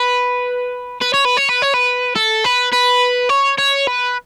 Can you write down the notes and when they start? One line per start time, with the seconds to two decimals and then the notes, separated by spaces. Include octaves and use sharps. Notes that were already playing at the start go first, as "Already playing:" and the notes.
Already playing: B4
1.01 B4
1.14 C#5
1.25 B4
1.37 C#5
1.49 B4
1.62 C#5
1.74 B4
2.16 A4
2.45 B4
2.73 B4
3.30 C#5
3.58 C#5
3.87 B4